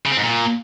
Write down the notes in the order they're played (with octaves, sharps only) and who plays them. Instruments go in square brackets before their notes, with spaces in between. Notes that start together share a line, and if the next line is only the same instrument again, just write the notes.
[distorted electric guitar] C#3
C4
G#2
A#2